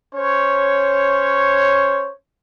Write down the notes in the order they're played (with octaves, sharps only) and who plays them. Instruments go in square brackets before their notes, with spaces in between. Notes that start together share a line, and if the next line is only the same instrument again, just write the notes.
[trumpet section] C#4 C5 C#5